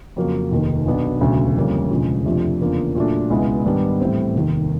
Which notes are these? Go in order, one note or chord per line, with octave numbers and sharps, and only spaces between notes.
F2 C#3 F#3 A#3
F1 D#2 D#3
B1 B2 F#3 B3 D4
E1 D2 C#3 F#3
F2 D3 G3 A#3 C#4
E1 D2 C#3 F3 G#3
F2 C3 F3 A3 D4
E2 C#3 F3 A#3 D4
A#2 F#3 A3 D4
C#2 B2 G#3 B3 E4
G#2 D#3 G3 B3 D4
A2 E3 G3 C4
F1 D#2 D#3